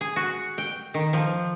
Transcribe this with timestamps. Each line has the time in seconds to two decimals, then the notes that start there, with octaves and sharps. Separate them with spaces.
0.01 G#4
0.16 F#4
0.58 G5
0.94 D#3
1.13 F3